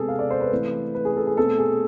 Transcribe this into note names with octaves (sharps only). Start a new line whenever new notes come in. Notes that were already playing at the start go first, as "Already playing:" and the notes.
Already playing: C3 G#3 B3 G#4 A4
F5
D5
C5
B4
E3 A3 C4
B4
G#4
A4
G#4
B2 A3 C4 A4
G#4